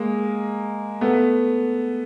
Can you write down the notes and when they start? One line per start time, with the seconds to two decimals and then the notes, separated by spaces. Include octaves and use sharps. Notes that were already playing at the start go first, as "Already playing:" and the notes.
Already playing: G#3 A#3
1.01 A3 B3